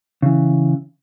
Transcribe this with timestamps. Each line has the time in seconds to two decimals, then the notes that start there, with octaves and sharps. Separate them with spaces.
0.23 C#3 E3